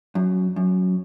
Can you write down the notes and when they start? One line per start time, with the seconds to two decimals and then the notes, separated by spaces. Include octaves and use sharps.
0.15 F#2
0.56 F#2